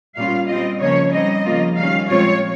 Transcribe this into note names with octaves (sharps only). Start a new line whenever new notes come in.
A#2 G3 C#4 F4 F5
G3 C4 F4 D#5
C#3 F3 A#3 C#4 C#5
G3 C4 D#4 D#5
C#3 F3 A#3 F4
D#3 G3 C#4 F5
A#2 F3 G#3 C4 F4 C#5